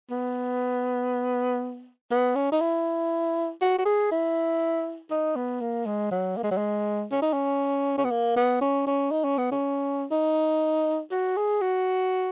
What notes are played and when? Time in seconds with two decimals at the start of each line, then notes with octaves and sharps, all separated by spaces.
0.10 B3
2.11 B3
2.35 C#4
2.52 D#4
2.60 E4
3.61 F#4
3.79 F#4
3.86 G#4
4.11 E4
5.11 D#4
5.36 B3
5.61 A#3
5.86 G#3
6.11 F#3
6.37 A#3
6.43 G#3
6.51 F#3
6.57 G#3
7.11 C#4
7.22 D#4
7.33 C#4
7.98 C#4
8.04 B3
8.11 A#3
8.36 B3
8.61 C#4
8.87 C#4
9.11 D#4
9.24 C#4
9.38 B3
9.51 C#4
10.11 D#4
11.11 F#4
11.37 G#4
11.61 F#4